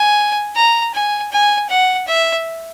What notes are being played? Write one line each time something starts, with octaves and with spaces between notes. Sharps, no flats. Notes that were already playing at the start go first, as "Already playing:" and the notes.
Already playing: G#5
A#5
G#5
G#5
F#5
E5